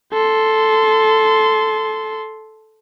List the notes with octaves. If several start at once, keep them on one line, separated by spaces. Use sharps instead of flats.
A4 C6